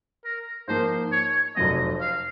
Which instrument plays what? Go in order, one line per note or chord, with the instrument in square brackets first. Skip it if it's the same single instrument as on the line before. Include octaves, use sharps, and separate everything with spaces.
[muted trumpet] A#4
[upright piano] G#2 F3 A#3 [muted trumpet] C5
[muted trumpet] C#5
[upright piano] F1 F2 C3 F#3 C4 [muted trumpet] D#5
[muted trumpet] F5